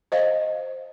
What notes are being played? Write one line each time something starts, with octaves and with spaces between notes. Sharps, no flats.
C5 D#5 F5